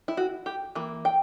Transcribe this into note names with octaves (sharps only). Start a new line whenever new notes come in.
E4
F#4
G4
E3 A#3
G5